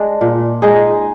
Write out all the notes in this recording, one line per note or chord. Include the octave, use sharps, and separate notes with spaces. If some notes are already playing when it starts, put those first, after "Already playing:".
Already playing: G#3 D4
A#2
G#3 D#4 G#4